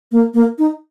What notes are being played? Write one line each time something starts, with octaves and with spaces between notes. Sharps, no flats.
A#3
A#3
D#4